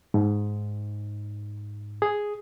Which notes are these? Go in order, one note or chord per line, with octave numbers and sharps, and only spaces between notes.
G#2
G#4